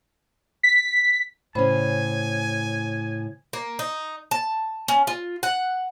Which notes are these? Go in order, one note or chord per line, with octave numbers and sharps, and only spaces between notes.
B6
A2 C#3 C#4 C5 G#5 B5
A#3
D#4
A5
C#4
F4
F#5